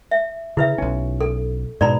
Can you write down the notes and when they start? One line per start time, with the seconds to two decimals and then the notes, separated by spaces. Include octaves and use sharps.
0.11 E5
0.57 C#3 E4 B4 E5
0.78 B1 C#4
1.21 A4
1.81 G#2 B2 D5 A#5 B5